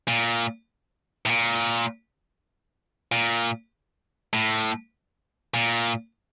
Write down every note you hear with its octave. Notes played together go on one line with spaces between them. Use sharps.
A#2
A2
A#2
A#2
A2
A#2